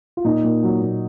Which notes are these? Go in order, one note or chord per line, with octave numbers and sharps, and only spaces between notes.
F4
A#2 D#4
A#2
F#3
A#2